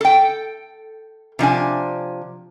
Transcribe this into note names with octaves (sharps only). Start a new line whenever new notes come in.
A4 G5
C3 F3 D4 G#5